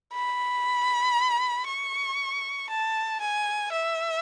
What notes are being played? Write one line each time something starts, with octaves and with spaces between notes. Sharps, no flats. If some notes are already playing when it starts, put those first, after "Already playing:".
B5
C#6
A5
G#5
E5